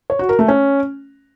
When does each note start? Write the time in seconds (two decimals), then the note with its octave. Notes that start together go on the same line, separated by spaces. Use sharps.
0.10 C#5
0.19 F#4
0.29 A#4
0.39 A3
0.48 C#4